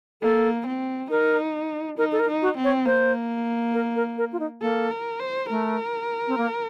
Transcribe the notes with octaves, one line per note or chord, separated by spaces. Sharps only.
A#3 A4
C4
D#4 A#4
D#4 A#4
A4
A#4
D#4
F#4
C4
C#5
A#3 C5
A#4
A#4
A#4
F4
D#4
A#3 A4
A#4
C5
A3 A#4
C4
A#3